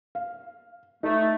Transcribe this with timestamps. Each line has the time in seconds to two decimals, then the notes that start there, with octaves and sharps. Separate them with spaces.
0.15 F5
1.03 A3 D#4